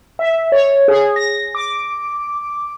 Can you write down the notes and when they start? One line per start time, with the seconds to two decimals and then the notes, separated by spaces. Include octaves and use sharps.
0.19 E5
0.52 C#5
0.88 G#4
1.16 A#6
1.55 D6